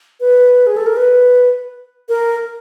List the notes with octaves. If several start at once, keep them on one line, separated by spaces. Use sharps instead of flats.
B4
G#4
A4
A#4
B4
A#4